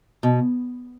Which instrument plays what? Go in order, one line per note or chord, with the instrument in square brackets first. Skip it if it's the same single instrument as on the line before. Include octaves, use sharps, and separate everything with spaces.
[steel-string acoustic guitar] B2